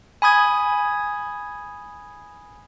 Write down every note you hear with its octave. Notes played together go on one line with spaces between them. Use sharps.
G#5 B5 D#6 G#6